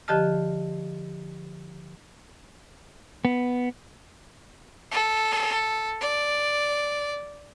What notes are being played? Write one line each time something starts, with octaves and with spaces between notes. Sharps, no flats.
D3 F3 G4 D#5 A5 F6
B3
A4
D5